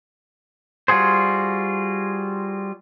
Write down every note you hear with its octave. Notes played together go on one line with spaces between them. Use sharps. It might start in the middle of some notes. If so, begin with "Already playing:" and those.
G3 F4 F#4 G#4 C5